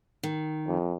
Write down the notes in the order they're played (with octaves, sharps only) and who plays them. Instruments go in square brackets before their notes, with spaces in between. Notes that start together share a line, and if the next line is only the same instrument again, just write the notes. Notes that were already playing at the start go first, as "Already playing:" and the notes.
[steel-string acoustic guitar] D#3
[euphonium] F2